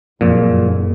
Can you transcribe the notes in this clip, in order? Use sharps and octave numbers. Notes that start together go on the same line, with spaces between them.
F#1 F2 A#2